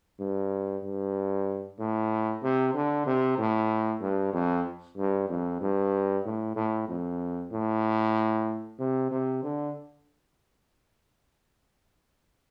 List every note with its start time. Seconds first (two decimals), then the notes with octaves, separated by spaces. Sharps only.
0.20 G2
0.84 G2
1.79 A2
2.43 C3
2.74 D3
3.06 C3
3.38 A2
4.02 G2
4.33 F2
4.97 G2
5.29 F2
5.61 G2
6.25 A2
6.56 A2
6.89 F2
7.52 A2
8.79 C3
9.11 C3
9.43 D3